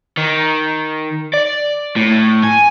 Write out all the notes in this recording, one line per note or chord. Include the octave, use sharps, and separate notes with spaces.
D#3
D5
A2
G#5